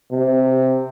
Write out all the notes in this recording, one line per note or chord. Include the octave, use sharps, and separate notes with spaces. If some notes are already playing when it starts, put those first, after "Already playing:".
C3